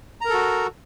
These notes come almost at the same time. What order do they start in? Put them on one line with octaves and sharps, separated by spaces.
A#5 A#4 A4 F#4